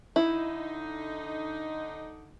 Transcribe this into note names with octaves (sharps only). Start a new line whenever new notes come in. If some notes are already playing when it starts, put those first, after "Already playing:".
D3 D#4 E4